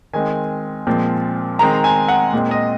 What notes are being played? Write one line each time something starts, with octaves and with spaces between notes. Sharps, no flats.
D#3 G#3 C4 G#5
A#2 F3 G#3 C4
D#3 G#3 C4 A#5
G#5
F#5
A#2 G#3 C4
D#5